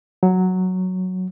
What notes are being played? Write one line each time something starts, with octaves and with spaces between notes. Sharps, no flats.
F#3